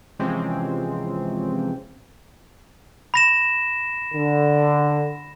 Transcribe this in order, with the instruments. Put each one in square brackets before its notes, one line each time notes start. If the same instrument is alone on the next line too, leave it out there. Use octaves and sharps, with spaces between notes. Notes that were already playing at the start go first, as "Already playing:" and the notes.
[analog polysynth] C3 E3 F3 G#3 C4 C#4
[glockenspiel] B5 A#6 E7
[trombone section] D3